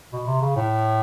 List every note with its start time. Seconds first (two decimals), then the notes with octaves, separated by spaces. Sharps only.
0.13 B2
0.27 C3
0.41 C#3
0.56 A2